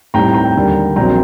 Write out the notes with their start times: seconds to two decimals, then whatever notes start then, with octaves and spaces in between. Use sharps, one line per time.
0.14 A2 G3 C4 D#4 G5 A#5
0.34 G5 A#5
0.56 D#2 D3 G3
0.96 A#1 A#2 F#3 C4 G5 A#5